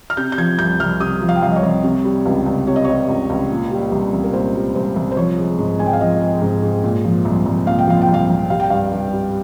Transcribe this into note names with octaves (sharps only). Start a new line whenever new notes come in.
F6
C3 G6
G6
F3 G#6
C2 G6
C2 F6
C3 D#6
F3
F5
G5
C2 F5
D#5
C#5
C2
C3
G3
C#2
C#2
C3 C#5
D#5
G3 C#5
C#2
C#2
A#2
G3
C2
C2
A#4
A#2 C5
G3
C2 C5
C2
C5
F3 C#5
G#3
G#2
G#2 G#5
G5
F5
F3 D#5
G#3
G#2
G#2
A#2
F3
C2
C2
A#2 F5
G5
F3 F5
G5
C2
F5
C2
G3 F5
G5
G2 F5
G2
G3